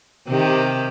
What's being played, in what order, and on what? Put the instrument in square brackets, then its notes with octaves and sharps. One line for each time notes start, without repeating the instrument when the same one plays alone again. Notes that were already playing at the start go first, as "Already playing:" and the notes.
[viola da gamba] C3 D#3 G4